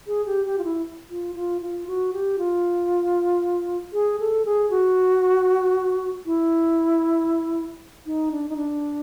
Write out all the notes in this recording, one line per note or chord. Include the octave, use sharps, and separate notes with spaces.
G#4
G4
G4
F4
E4
F4
F4
F4
F#4
G4
F4
G#4
A4
G#4
F#4
E4
D#4
D4
D#4
D4